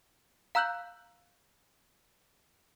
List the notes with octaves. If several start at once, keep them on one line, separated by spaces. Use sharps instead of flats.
F5 A#5 E6 F#6 G6 F#7